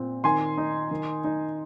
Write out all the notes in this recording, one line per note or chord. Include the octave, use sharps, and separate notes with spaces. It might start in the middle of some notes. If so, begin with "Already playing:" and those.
Already playing: A#2 C4
D#3 G#5 C6
D#4
D#3
D#4